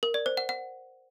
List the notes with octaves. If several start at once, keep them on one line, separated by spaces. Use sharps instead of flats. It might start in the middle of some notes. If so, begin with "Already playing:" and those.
A#4
D5
C5
F#5
F#5